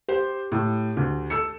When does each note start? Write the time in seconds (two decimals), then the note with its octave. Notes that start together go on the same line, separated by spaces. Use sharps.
0.09 G4 C5
0.52 A2
0.97 D2
1.30 A4 E6 C#7